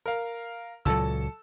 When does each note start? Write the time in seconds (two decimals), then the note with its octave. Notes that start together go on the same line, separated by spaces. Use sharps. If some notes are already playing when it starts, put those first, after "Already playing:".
0.06 A#4 F5
0.85 C#2 A#2 F#3 A4 A5 E6